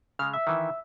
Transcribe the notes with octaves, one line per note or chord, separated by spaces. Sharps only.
C#3 G#3 F6
E5
D#3 E3